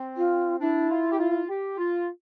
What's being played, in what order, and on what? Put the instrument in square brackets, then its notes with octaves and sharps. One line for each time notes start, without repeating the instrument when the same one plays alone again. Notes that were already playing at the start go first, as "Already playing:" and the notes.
Already playing: [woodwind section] C4
[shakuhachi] F4
[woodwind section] D4 [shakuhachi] E4
[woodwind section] F4
G4
F4
G4
F4